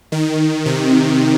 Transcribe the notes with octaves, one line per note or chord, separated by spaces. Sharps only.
D#3
C3